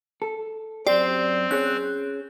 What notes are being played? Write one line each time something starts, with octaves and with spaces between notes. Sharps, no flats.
A4
F#2 C4 G4 D5 C7
C#4 G#4 C#5 F#6